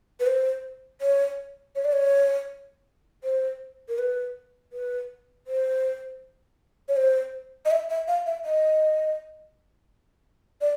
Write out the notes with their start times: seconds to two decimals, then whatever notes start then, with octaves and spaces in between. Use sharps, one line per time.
0.20 B4
0.26 C5
1.01 C#5
1.75 C#5
1.85 D5
1.92 C#5
3.24 C5
3.89 A#4
3.98 B4
4.73 B4
5.47 C5
6.88 C#5
6.96 C5
7.65 D#5
7.71 E5
7.90 E5
8.08 F5
8.26 E5
8.45 D#5
10.61 D5